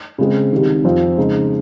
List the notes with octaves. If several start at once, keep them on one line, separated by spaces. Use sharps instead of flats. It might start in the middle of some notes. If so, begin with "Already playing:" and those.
C#3 G#3 C4
C2 C3 D#3
F2 C3 F3 C4 F4
C#3 G#3 D#4